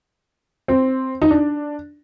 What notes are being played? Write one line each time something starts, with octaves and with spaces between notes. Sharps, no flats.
C4
D#4
D4